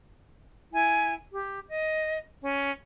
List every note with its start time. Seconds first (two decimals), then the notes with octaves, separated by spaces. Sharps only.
0.73 E4 G#5
1.33 G4
1.69 D#5
2.43 C#4